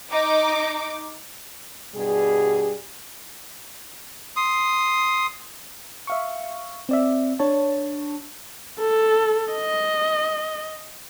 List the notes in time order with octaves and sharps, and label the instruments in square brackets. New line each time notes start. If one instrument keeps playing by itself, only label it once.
[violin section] D#4 D6
[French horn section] G2 B2 G3 G#4
[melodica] C6 D#6
[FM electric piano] E5 F5 C#6
C4 D5 E5
D4 C#5 A5
[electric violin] A4
D#5